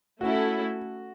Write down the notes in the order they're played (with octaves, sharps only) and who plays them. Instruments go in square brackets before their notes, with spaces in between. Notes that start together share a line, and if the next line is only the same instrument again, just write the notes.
[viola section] A3 C#4 E4 A4 [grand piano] F#4